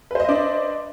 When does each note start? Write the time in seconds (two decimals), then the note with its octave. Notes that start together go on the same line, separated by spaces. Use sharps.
0.11 B4
0.15 C5
0.20 D#5
0.24 E5
0.29 D4